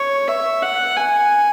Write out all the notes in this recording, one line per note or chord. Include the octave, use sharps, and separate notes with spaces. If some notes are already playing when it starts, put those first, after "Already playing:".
Already playing: C#5
E5
F#5
G#5